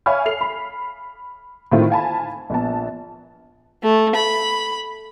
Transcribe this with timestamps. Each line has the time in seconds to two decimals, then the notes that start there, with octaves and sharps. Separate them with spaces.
0.06 C#5 E5 F5 G#5 B5 F6
0.25 A4 C7 F7
0.41 B5
1.72 A2 D#3 C4 E4 F4
1.90 F5 G#5 A5 B5
2.50 A#1 B3 A5
3.83 A3
4.15 B5